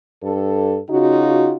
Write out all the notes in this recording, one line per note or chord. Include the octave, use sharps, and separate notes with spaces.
G2 A4
C#3 D#4 F4 F#4